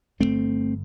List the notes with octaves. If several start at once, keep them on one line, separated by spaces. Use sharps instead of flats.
G1 F2 D3 A3 C4